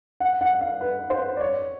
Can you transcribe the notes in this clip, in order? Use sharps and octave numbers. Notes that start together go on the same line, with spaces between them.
F#5
F#5
F5
B4
C5
D5
C#5